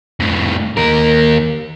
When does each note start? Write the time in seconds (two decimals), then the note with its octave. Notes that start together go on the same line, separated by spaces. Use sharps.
0.20 F2 A2
0.77 D#2 A#4